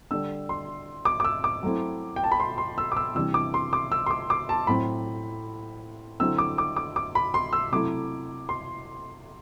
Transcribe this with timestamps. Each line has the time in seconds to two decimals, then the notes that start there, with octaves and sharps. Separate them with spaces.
0.11 D3 G3 D4 E6
0.49 C6
1.05 D6
1.20 D6
1.25 E6
1.44 D6
1.63 F#3 A3 C4 E4
2.16 G5
2.24 A5
2.32 B5
2.40 C6
2.58 C6
2.78 E6
2.92 D6
2.97 E6
3.15 C3 E3 G3 D4 E6
3.34 D6
3.54 C6
3.73 D6
3.92 E6
4.06 C6
4.10 D6
4.30 D6
4.49 A5
4.67 A2 F#3 C4 B5
6.20 D3 F#3 C4 E4 E6
6.38 D6
6.58 D6
6.76 D6
6.96 D6
7.15 B5
7.34 C6
7.53 E6
7.72 C3 F#3 A3 E4 D6
8.49 C6